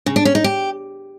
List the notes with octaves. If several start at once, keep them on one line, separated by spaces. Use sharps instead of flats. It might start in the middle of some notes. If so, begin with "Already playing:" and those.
C#3
D4
C#4
D#4
G4